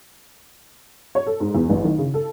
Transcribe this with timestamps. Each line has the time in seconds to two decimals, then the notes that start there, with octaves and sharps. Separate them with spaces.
1.15 C#5
1.27 A4
1.40 G#2
1.55 E2
1.70 A1
1.84 D#3
1.98 C#3
2.14 A4